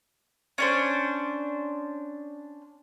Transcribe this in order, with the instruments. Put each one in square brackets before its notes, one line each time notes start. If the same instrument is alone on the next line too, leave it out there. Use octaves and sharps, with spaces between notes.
[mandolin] C#4 D4 C5